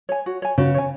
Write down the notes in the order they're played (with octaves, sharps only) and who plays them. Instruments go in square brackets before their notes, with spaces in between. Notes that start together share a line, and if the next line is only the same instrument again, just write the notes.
[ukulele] C#5 G#5
F#4
C#5 G#5
[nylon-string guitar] C#3 [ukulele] F#4
[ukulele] C#5 G#5